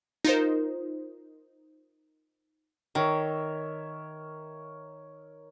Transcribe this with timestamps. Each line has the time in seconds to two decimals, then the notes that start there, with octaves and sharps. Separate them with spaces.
0.25 D#4 F4 A#4 C5
2.95 D#3 A#4 C#5 E5